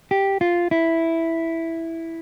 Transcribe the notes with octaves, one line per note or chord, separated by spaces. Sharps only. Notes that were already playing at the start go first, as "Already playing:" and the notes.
G4
F4
E4